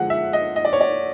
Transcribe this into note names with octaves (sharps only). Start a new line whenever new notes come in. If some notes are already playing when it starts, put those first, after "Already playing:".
Already playing: D3 F3 G#3 F#5
E5
D#5
D#5
D5
C#5
D5